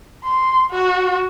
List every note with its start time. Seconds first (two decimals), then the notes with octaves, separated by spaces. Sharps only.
0.24 C6
0.71 F#4